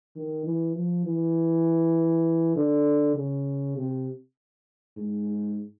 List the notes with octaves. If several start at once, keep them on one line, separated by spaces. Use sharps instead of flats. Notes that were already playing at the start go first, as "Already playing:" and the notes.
D#3
E3
F3
E3
D3
C#3
C3
G#2